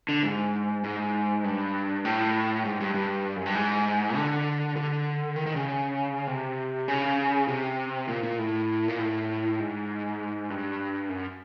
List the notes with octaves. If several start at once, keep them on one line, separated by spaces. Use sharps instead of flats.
D3
G#2
G#2
G2
A2
G#2
G2
G2
F#2
G2
G#2
D3
D3
D#3
D#3
C#3
C3
C#3
C3
A#2
A#2
A2
A#2
A2
G#2
G2
F#2